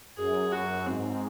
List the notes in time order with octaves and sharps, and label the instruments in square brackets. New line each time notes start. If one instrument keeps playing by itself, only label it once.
[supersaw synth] F#2 [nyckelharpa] G#4
[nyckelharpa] F#4
[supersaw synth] G#2 [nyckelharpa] C4